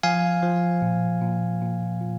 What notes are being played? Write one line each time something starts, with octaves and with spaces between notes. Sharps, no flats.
F3 F5 G#5
F3
A#2
A#2
A#2
A#2